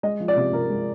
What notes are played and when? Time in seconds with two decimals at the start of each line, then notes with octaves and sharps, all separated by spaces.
0.03 G#3 D#5
0.20 F3
0.28 D5
0.36 C3
0.53 C3 A#4
0.70 G#3